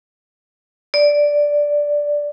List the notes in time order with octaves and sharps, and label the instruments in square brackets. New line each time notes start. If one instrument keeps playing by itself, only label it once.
[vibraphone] D5